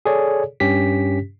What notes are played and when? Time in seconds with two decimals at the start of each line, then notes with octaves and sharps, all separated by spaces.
0.06 G#4 A4 C#5 D5
0.60 G2 C#4 G4 B6